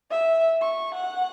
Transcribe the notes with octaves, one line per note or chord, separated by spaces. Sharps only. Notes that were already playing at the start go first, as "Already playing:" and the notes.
E5
C#6
F#5